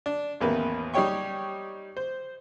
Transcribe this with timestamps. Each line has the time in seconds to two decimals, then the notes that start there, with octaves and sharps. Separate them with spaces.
0.06 D4
0.41 A1 E2 D#3 A#3 B4
0.94 G3 D#4 G4 C#5 G5 C#6
1.97 C5